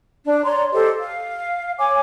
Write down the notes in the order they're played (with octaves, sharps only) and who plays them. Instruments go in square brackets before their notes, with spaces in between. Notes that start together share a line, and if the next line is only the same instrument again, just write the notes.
[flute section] D4
C#5 D5 A#5 C6
G4 A4 C5 D#5
F5
C#5 G#5 D6